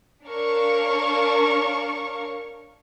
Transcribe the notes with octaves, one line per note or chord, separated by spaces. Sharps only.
D4 A#4 C#5 F5 C#6